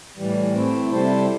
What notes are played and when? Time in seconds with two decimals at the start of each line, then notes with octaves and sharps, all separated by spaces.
0.17 A2 E3 G3
0.53 A3 C4 E4
0.89 C3 G3 E4 A4 C5